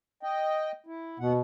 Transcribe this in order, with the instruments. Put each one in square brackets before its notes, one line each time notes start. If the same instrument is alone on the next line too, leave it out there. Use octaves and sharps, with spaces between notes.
[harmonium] D#5 G5
E4
[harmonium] D#2 B3 F#5 [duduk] B2